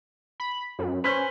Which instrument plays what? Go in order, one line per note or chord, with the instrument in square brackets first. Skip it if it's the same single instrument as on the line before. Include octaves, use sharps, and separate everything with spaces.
[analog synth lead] B5
F#2
[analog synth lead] C#4 [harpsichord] B4 C5